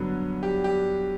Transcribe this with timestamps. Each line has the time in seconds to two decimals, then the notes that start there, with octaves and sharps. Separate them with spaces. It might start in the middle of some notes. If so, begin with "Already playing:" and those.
Already playing: G2 D3 F#3 B3
0.43 G4
0.64 G4